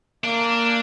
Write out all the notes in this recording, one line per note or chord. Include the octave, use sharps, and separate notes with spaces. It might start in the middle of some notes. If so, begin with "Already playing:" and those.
A#3 D4